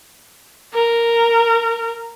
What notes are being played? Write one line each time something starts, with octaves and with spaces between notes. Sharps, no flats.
A#4